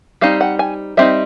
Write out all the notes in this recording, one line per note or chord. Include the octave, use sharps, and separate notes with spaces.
G3 C4 D#4 F5
F#5
G#5
G3 C4 D#4 E5